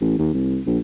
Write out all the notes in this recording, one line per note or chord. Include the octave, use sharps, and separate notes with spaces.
A1
D#2
C2
A#1